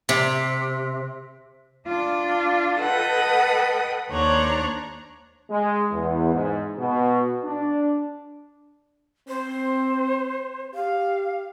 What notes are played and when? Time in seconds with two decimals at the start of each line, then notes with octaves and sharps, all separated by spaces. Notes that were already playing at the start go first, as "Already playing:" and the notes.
0.09 C3
1.86 D4 F4
2.80 A4 B4 D#5 F#5 G5 D#6
4.11 D#2 D4 C5 C#5 A#5 F#6
5.50 G#3
5.92 E2
6.33 G#2
6.78 B2
7.44 D4
9.28 C4 C5
10.75 G4 F5